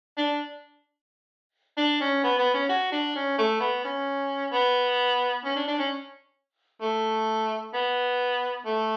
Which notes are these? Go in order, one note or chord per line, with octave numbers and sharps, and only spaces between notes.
D4
D4
C#4
B3
B3
C#4
F#4
D4
C#4
A3
B3
C#4
B3
C#4
D4
D4
C#4
A3
B3
A3